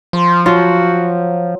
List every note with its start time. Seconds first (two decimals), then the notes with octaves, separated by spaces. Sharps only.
0.13 F3 C6
0.46 F#3 F4 F#4